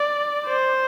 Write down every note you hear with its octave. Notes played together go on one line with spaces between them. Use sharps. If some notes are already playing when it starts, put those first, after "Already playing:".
Already playing: D5
C5